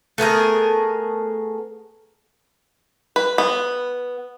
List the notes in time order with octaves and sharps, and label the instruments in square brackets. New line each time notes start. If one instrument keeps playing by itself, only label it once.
[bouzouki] A3 B3 G#4 A#4
[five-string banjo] B4
B3